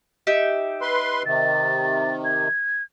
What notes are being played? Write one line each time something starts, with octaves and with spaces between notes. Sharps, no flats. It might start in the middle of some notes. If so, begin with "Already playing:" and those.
D#4 G4 E5
B4 C6
C3 D#3 A6
G#6